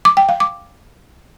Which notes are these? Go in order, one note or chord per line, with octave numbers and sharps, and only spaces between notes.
D6
G5
F5
D6